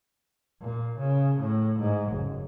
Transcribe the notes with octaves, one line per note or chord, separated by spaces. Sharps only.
A#2
C#3
A2
G#2
F#1